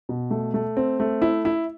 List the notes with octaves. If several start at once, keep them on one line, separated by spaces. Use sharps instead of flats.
B2
A3
A3
C4
A3
E4
E4